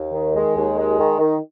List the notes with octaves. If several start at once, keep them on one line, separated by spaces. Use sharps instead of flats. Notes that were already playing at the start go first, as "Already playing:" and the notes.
Already playing: D#2
D#3
G#3
D#2
G#3
D#3
D#3